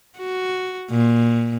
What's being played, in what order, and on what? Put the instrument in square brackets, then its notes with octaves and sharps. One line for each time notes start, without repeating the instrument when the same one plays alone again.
[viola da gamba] F#4
A#2